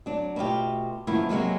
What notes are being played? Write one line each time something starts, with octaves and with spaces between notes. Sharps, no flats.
F#3 D4
B2 A3 F4 G4
F#2 D#3 F3 A#3 B3 E4
C3 F#3 G#3 A#3 B3